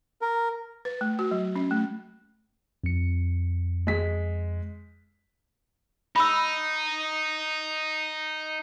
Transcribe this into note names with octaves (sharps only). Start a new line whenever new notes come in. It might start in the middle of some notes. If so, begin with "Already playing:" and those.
A#4
B4
A3
F#4
F#3
C#4
A3
F2 C#7
G#3 B6
D#4 B5 E6